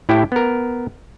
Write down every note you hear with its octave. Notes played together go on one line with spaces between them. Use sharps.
A2 E4 G4 G5
B3 A#4